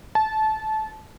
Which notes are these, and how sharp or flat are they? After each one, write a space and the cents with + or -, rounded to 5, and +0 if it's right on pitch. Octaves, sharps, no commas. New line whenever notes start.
A5 -20